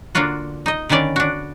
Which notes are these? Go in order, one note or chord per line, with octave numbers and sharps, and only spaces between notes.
D3 A#3 D4 F4 F#4
D#4 D#5
D3 D#3 B3 C#4 D5
D4 F#4